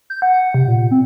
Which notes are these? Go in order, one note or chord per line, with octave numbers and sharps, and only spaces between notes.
G6
F#5
C3
A#2
C4